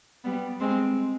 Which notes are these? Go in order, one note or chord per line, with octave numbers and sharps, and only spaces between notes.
G3 B3
G#3 C4